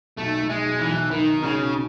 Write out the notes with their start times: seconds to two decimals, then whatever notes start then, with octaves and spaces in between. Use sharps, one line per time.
0.18 B1 A3
0.42 B1
0.50 G#3
0.66 B1
0.80 E3
0.88 B1
1.11 B1 D#3
1.35 B1
1.43 C#3
1.58 B2